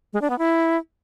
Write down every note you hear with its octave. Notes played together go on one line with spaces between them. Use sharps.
G#3
D4
B3
E4